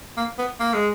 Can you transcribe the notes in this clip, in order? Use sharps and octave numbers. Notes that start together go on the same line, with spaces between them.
A#3
B3
A#3
G#3